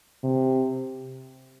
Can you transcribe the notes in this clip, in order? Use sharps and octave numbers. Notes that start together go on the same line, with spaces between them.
C3